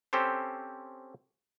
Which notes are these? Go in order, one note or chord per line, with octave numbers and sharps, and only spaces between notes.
C4 C#4 G4 A4 C5